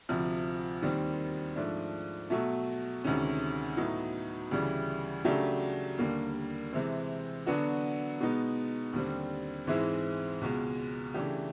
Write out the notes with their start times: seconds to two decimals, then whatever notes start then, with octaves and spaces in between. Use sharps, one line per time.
0.09 D2 C3 F3
0.82 D#2 D#3 G3 C4
1.56 G#2 F3 A3 D4
2.30 B2 F#3 A3
3.04 D2 C3 D#3 G#3 C#4
3.77 A2 F#3 B3 D#4
4.51 D2 C#3 E3 G3
5.25 C#3 F#3 A3 D4 G4
5.98 D#2 D3 G3 A#3
6.73 C3 E3 G#3 C4
7.46 D3 F#3 B3 D4 F#4
8.20 B2 G#3 B3 D#4
8.93 D#2 D3 G3 C4
9.67 G#2 E3 G#3 C4 E4
10.41 C#2 B2 G#3
11.14 C#3 E3 A3 D4 G4